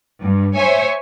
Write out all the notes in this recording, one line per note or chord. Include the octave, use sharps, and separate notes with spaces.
G2
C5 C#5 E5 G#5